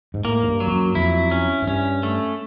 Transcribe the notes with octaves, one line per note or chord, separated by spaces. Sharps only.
G#2
A2 A#3
G#2
G2
F#3
F2
F#2
F2 E4
C#4
G#2
G2 C#4
A3